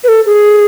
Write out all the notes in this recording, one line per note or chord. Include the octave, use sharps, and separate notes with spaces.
B4
A4
G#4